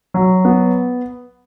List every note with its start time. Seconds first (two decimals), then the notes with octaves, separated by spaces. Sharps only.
0.14 F#3
0.45 B3